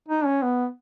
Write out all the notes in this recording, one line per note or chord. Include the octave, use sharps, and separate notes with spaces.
D#4
C#4
B3